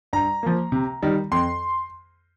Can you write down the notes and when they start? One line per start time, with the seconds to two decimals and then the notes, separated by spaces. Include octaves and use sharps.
0.13 G2 A#5
0.43 F3 A#3
0.72 C3
1.03 D#3 G3
1.31 F2 C6